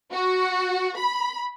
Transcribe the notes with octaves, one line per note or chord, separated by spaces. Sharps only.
F#4
B5